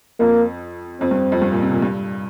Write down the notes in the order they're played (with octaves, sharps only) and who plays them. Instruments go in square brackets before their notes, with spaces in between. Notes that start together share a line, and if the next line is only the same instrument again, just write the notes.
[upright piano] F2 [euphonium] A#3
[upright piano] F2 [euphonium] C4
[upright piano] G2
F2
G2
A#2
C3
A#2
G2